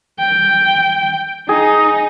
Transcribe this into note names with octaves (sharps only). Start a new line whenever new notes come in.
G5
D#4 G#4